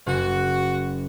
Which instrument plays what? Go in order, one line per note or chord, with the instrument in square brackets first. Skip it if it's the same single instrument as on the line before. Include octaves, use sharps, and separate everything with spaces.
[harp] F#1 [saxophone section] F#4